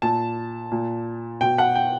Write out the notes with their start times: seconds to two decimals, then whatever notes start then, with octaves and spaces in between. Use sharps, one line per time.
0.02 A#2 A5
0.72 A#2
1.41 B2 G5
1.58 F#5
1.75 G5